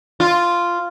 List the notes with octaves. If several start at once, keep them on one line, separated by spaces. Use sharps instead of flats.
F4